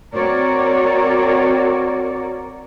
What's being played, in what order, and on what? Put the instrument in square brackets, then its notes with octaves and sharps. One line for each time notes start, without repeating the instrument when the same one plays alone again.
[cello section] C4 F#4 A#4 C#5 D5